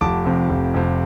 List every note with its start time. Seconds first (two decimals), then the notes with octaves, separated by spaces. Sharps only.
0.01 F1 A5 D6
0.25 F2 C3
0.50 F1
0.74 F2 C3